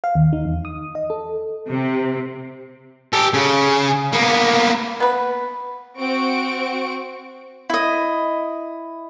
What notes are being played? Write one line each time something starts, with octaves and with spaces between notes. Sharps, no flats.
F5
D#2
D#4
E2
D#6
D#5
A4
C3
G4 A4
C#3
A#3 B3
B3 B4
C4 F#4 C#6 D7
E4 D#5